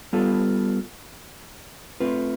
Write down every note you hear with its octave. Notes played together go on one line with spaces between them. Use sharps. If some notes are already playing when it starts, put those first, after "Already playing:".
G3 B3 F4 A4
A3 C4 F4 B4